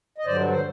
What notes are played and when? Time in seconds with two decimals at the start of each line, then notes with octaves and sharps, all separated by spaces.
0.18 D#5
0.26 G2 D3 F#3 C5 D5
0.50 C5